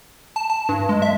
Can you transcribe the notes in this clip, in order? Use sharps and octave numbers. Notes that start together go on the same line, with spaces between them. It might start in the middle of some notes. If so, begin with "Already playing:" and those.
A5
A5
G2
G#3
E5